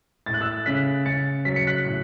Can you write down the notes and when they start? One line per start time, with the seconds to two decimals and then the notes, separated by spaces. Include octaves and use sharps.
0.26 A2 A6
0.34 F#6
0.41 E6 A6
0.66 C#3 F#6 B6
1.06 C#3 A6 C#7
1.45 F#3 B6
1.56 C#7
1.67 F#6 B6
1.85 A2